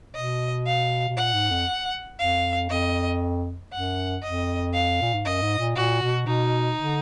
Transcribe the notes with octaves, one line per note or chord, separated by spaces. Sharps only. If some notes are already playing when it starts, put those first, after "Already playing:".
B2 D#5
F5
B2
A#2 F#5
G#2
F2
F2 F5
F2 D#5
F#2 F#5
F2 D#5
F5
A#2
G#2
F#2 D#5
G#2
A#2
A#2 F#4
B2
B2 D#4
D3